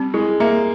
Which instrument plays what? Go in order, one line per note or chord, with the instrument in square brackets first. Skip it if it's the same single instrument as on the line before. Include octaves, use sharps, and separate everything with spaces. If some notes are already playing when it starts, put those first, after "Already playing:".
Already playing: [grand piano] G3 [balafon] C4
[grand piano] G#3 [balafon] E4
[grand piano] A#3 [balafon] E5